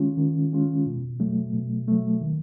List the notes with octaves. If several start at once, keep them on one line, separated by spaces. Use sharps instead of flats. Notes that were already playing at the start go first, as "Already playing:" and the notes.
Already playing: D#3 G#3 C#4 F4
D#3
G#3 C#4 F4
B2
F#3 A3
B2
F#3 A3
D#3